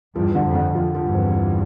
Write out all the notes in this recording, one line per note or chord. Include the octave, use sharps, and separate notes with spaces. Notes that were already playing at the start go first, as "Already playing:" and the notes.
E2 G2 F3
D3
F2
D3
F2 F4
F3
E2 G2
C4
F3